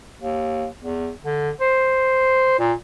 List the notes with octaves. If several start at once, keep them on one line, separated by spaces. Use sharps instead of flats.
D#2
E2
D3
C5
A#2